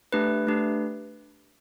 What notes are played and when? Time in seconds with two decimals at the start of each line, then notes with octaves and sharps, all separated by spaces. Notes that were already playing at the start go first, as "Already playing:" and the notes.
0.12 A3 D4 G4 B4
0.47 A3 D4 G4